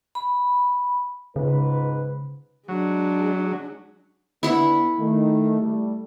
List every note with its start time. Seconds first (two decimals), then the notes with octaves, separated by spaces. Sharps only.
0.15 B5
1.36 C#2 G#2 C#3 B4
2.68 F#3 G#3 D4
4.43 D3 B3 E4 E5 F#5
4.98 D#3 A3
5.60 G3 A3